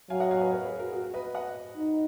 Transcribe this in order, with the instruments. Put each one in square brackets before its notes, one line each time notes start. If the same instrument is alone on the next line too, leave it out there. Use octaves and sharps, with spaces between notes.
[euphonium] F#3 [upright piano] F5 G#5
[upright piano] D#5 F#5
F5 G#5
B4 D#5
A#4 C#5
G#4 B4
F#4 A#4
F#4
F#4
B4 D#5
D#5 F#5
[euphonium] D#4